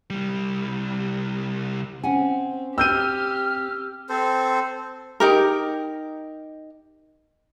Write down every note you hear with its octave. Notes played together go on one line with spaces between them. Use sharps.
C2 G3
C4 C#4 F#5 G#5
C4 G4 E6 F6 G6 D#7
C4 A4 C5
D#4 G4 A#4